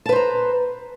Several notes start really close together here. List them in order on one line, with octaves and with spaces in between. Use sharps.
A5 B4 C5 A#5